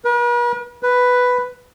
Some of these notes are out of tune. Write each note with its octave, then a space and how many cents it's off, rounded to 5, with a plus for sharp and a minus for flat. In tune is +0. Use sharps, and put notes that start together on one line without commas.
B4 -45
B4 +5